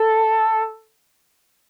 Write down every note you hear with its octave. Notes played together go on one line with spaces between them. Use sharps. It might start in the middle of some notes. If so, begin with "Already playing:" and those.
Already playing: A4